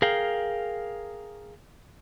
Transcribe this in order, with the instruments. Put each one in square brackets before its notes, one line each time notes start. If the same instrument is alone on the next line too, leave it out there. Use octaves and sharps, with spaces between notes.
[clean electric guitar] G#4 A#4 F5 G5